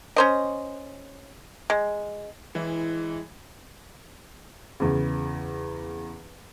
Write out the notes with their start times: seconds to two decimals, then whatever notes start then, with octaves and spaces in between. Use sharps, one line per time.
0.16 C#4 C5 D#5
1.70 G#3
2.55 E3 G#3 E4
4.80 E2 C#3